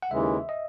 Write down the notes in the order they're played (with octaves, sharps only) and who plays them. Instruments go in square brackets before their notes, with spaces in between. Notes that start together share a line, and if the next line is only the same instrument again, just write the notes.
[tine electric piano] F#5
[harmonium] D#2 C#3 E3 G#3 [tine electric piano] E5
[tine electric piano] D#5